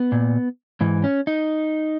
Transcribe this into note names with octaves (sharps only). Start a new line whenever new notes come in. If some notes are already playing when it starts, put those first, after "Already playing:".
Already playing: B3
A#2
G#2 E3
C#4
D#4